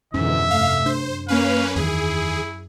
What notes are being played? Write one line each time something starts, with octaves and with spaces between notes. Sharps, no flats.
F2 G#2 B2 D3 E3 C#4 E5
G2 C3 A3 F5
F#2 D4 C5
A#3 C#4 B4 F5
E2 D#3 E4 G#4